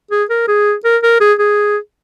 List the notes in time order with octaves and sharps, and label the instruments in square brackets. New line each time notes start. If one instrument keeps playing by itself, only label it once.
[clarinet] G#4
A#4
G#4
A#4
A#4
G#4
G#4